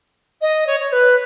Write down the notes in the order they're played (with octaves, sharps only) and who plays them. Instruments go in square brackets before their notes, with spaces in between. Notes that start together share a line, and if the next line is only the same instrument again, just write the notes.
[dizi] D#5
C#5
C#5
B4